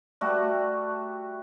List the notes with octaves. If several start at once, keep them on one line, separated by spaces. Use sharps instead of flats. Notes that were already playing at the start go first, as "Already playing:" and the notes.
G3 A3 F#4